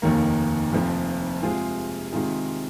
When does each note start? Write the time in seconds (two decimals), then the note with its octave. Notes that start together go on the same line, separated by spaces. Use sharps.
0.02 F1 D#2 D#3 A#3
0.72 F1 F2 F3 C4
1.43 C3 G#3 F4 G#4
2.12 C3 D#3 G#3 F4 G#4